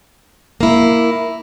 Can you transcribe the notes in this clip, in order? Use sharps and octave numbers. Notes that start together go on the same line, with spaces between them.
A#3 E4